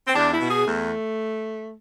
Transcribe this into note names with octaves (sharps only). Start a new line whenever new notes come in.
C4
E2 D4
E4
B2
G#4
E2 A3